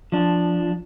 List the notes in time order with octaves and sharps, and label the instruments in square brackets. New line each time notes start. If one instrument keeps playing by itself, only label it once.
[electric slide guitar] F3 D4